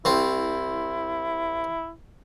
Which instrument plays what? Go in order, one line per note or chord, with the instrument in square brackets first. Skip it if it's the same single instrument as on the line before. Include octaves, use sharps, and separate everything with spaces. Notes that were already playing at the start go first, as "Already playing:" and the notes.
[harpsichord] C2 C4 [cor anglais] E4